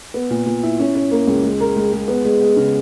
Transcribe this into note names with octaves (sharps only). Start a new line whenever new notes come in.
B3
A#2
A#2
E4
C#4
C#4
A#3
C#2
G#3
A#4
G#3
G#3
B3
G#3
G#3
C#3